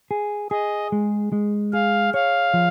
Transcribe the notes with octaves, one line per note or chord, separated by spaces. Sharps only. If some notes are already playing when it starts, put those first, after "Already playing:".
G#4
G#4 D#5
G#3
G#3
G#4 F5
C#5 F5
F3